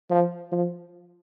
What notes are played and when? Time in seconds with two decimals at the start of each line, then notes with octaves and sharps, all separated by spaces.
0.10 F3
0.52 F3